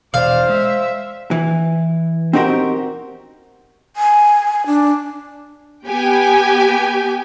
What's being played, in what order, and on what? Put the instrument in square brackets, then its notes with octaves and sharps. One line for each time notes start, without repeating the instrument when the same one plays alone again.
[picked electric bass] E1 B2 E3 [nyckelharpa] C5 [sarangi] D5 [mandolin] F5
[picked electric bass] G#3 [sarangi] E5
[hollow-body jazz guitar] E3
C4 D#4 F#4 G4 A#4 C5
[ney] G#5
D4
[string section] B3 G4 G5 G#5